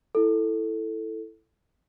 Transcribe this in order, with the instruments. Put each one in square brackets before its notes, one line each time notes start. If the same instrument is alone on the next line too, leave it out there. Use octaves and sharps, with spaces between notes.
[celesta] E4 A4